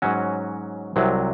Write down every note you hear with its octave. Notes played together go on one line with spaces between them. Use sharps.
G#2 F#3 C#4 F#4
C2 C3 F#3